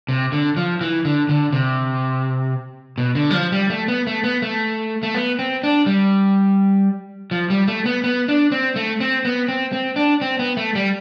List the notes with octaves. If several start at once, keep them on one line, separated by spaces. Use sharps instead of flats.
C3
D3
F3
E3
D3
D3
C3
B2
D3
G3
F3
G3
A3
B3
A3
B3
A3
A3
B3
C4
D4
G3
F3
G3
A3
B3
B3
D4
C4
A3
C4
B3
C4
C4
D4
C4
B3
A3
G3